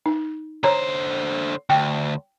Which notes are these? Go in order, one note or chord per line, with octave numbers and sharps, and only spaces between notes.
D#4
D3 C5 C#5 A#5
D2 G5